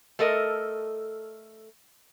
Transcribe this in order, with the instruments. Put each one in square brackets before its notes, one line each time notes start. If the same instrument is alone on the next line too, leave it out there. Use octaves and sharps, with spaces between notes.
[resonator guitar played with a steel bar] A3 A4 A#4 D#5